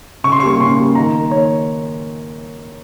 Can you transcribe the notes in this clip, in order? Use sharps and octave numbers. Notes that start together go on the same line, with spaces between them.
C#3 C#6
C6
C#6
G3 A#3
C#3 C6
G3 A#3
D#3 A#5
G3 A#3
D#3 C#5